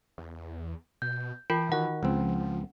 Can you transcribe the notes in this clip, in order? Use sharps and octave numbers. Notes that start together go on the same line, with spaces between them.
E2
B2 G6
E3 F4 A#4 G5 B5
D#3 F#4 F#5
C#2 F3 C4